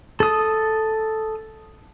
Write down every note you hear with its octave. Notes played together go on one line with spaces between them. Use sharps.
A4 D#6